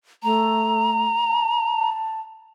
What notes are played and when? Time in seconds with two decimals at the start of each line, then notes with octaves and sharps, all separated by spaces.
0.23 A3 A#5
1.27 A5